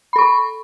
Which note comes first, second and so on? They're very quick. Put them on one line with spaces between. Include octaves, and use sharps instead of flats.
B5 A4 C#6